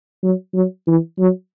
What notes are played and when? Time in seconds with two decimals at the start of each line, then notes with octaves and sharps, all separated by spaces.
0.23 F#3
0.54 F#3
0.87 E3
1.19 F#3